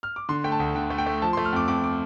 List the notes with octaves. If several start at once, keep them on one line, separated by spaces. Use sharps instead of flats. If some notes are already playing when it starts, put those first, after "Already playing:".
F6
D6
D3 C6
A3 G5
A5
D2
D3 G5
A3
G5
A3
F3 A5
C6
A3
F6
F2 D6
F2 D6
D6